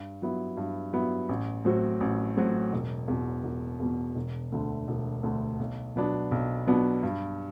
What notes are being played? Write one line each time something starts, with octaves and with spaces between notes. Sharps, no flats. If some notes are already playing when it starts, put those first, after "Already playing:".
Already playing: G2
F#3 B3 E4
G2
F#3 B3 E4
A1
A2 F#3 C4 F#4
A1
A2 F#3 C4 F#4
E1
E2 B2
E1
E2 B2
E1
D2 D3 A3
E1
D2 D3 A3
B1
B2 F#3 B3 D4
B1
B2 F#3 B3 D4
G2